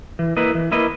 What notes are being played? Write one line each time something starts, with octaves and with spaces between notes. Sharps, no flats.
E3
A#3 E4 B4 D#5
E3
A#3 E4 B4 D#5